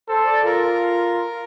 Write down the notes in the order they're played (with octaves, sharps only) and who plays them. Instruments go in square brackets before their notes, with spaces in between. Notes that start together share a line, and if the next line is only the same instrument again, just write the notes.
[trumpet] A4 [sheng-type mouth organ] C5
[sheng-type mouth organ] D5
[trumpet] F4 [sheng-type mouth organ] A#4